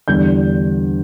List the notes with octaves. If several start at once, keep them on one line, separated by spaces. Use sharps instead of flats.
E2 D3 G3 D4 G6